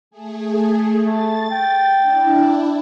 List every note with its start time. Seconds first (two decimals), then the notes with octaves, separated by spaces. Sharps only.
0.11 A3 G#4
1.07 A3 A6
1.51 G5
2.01 D4 E4